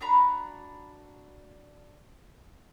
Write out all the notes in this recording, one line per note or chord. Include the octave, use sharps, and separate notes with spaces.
D4 F#4 A#5 B5